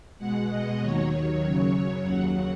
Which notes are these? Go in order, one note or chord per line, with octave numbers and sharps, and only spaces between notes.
B2 G#3 F#5
D#5
D#2 D#3 F#3 C#5
C#5
F#2 C#3 F#3
D#2 C#3 F#3 F#5